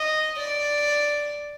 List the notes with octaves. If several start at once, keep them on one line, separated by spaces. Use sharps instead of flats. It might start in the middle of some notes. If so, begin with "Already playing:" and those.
Already playing: D#5
D5